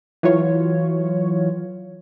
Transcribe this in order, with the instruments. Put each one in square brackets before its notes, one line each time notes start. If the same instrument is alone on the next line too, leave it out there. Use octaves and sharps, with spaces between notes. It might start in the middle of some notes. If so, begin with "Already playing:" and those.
[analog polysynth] E3 F#3 F4 C#5